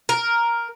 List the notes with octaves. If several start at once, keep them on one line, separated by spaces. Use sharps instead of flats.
A#4